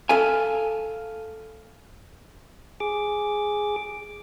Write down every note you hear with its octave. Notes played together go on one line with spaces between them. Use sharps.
A4 F5 G#5
G#4 D6